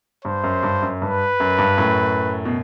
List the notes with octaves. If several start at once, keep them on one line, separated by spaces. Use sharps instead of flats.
G2 C5
F#2
G2
F#2
G2 B4
F#2
G2
F#2 A2
B2